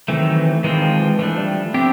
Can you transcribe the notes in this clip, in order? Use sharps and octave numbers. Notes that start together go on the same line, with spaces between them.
D#3 E3 F#3 A3 C4
D#3 E3 G#3 C4 F4
F3
E3
E3 F3 A3 D4
G3
B3 C4 D4 G4